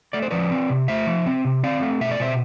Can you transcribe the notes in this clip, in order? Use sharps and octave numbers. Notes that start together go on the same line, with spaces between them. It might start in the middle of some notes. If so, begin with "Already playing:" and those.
A3 D5
C5
F3 B4 D5
C4
C3
A3 C5 E5
F3
C4
C3
C4 D5 F5
A3
B2 E5
D5
B2 C5 E5